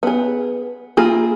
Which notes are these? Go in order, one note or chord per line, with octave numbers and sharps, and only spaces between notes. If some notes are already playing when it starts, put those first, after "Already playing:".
B3 G#4
A#3 E4 F4 G#4